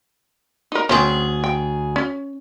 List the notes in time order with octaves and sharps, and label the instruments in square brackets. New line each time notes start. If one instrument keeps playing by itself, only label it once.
[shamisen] D#4 A#4
[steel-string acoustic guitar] D2 G#4 [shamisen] C4 C#4
[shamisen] G5
C#4